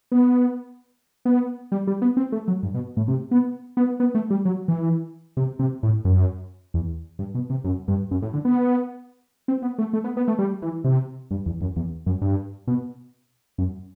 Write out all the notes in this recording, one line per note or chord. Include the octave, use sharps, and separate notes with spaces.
B3
B3
G3
G3
B3
C4
A3
F#3
G2
B2
A2
C3
B3
B3
B3
A3
G3
F#3
E3
C3
C3
A2
F#2
E2
G2
B2
C3
F#2
G2
F#2
A2
D3
B3
C4
B3
A3
A3
B3
B3
A3
G3
E3
C3
G2
E2
F#2
E2
F#2
G2
B2
F#2